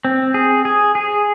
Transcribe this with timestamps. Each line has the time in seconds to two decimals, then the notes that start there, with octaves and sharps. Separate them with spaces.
0.05 C4
0.34 G#4
0.65 G#4
0.95 G#4